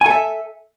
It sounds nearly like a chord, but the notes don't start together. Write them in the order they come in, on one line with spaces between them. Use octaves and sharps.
G#5 A4 E5